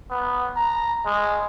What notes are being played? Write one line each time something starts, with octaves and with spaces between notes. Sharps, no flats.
B3
A#5
G#3